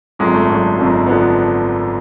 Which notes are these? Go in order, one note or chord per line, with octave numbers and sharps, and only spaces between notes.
G#1 F#2 D3 F3 G#3
A3
G#1 F#2 D3 F3
G#1 F#2 D3 F3
D3 F3 B3